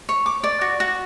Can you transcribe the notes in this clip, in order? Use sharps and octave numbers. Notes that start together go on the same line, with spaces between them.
C#5
D6
D5
F#4
F#4